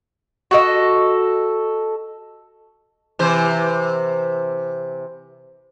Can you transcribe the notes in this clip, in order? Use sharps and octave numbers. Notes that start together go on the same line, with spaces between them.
F#4 A4 D#5
C3 E3 C5